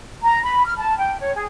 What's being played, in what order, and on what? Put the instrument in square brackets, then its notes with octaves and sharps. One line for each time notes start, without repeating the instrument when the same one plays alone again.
[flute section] A#5
B5
F6
A5
G5
C#5
G#4